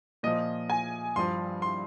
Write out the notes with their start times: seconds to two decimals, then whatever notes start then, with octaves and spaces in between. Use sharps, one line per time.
0.23 A#2 F3 D#5
0.70 G#5
1.16 G2 F3 C6
1.62 C6